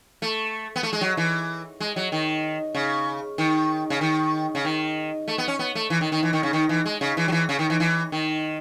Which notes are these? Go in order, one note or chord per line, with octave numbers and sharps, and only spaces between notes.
A3
B3
A3
G#3
F#3
E3
G#3
F#3
D#3
C#3
D#3
C#3
D#3
C#3
D#3
A3
B3
C#4
B3
A3
E3
D#3
D#3
E3
D#3
C#3
D#3
E3
G#3
C#3
E3
F#3
E3
C#3
D#3
E3
E3
D#3